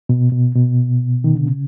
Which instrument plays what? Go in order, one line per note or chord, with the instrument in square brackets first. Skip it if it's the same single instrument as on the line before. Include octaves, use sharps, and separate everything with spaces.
[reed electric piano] B2
B2
B2
D#3
D3
C#3